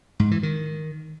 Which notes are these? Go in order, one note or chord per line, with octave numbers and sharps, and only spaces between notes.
G#2
E3
D#3